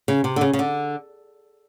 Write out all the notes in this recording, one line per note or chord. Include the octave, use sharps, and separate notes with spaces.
C#3
C3
D3
C#3
C#3
D3